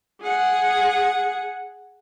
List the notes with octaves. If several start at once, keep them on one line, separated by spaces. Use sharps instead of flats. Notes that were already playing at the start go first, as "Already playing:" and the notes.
G#4 F#5